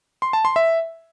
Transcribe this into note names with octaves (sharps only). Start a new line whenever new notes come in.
C6
A5
C6
E5